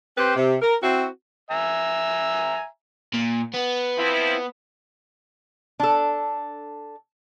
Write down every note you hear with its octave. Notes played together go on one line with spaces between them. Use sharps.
C4 G4 B4 C5
C3
A#4
C4 E4 F#4
E5 G#5 A#5
A#2
B3
F3 C4 E4
D4 A4